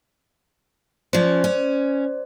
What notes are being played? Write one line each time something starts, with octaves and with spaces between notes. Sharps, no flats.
F3 C#4 C5 D5
C#4